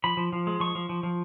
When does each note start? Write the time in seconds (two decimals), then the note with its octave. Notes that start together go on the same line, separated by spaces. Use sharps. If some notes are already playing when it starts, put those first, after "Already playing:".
0.04 F3 B5
0.17 F3
0.33 F3
0.47 G#3
0.60 F3 C#6
0.75 F3
0.89 F3
1.03 F3